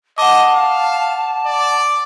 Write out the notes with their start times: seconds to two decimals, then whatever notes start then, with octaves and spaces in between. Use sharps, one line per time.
0.18 D#5 F#5 A5 D6
0.54 F5
1.46 D5